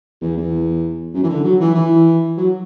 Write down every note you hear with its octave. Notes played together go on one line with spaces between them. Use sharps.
E2
E2
F#2
E3
D3
F#3
E3
E3
F#3